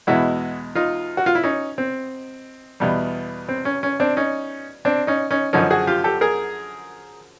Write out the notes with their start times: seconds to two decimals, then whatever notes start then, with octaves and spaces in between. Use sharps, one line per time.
0.07 E2 B2 G#3 E4 F#4
0.75 D#4 F4
1.17 F#4
1.26 F4
1.35 E4
1.43 C#4 D#4
1.78 C4
2.80 E2 B2 G3
3.49 C4
3.65 C#4
3.83 C#4
4.00 C4 D4
4.17 C#4 D#4
4.85 C4 D4
5.07 C#4 D#4
5.30 C#4 D#4
5.53 F#2 D3 F3 C#4 D#4
5.70 F#4 G#4
5.87 F4 G4
6.04 G4 A4
6.21 G#4 A#4